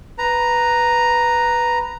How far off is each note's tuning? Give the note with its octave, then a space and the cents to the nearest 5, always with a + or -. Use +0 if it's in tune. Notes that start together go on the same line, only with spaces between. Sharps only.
B4 +0 A#5 +0